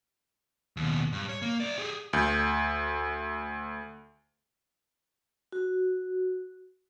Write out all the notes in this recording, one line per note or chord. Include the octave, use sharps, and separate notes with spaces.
D#2 B2
G2
C#5
A#3
C5 D5
G4 G#4
D2 G6
F#4